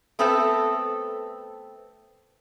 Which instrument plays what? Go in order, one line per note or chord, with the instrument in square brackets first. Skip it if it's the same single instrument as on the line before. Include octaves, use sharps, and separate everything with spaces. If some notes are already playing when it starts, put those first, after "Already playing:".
[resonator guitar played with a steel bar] A3 B3 C4 A4 B4 E5